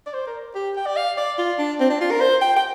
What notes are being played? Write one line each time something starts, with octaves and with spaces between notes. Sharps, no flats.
D5
C5
A#4
G4
G5
D5
F5
D5
F4
D4
C4
D4
F4
A#4
C5
G5
G5